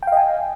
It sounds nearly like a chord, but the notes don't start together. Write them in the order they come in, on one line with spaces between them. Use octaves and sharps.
G5 F5 D#5 G#5